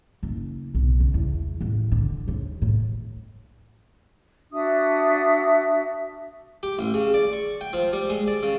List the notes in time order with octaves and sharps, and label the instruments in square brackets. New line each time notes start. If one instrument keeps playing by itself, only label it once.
[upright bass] F#1
B1
C#3
E2
A1
D3
D#2
A2
[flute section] D4 F#4 E5 D#6
[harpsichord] G4
A1
C#3
D5
C#6
G5
F3
G3
G#3
D5
C#3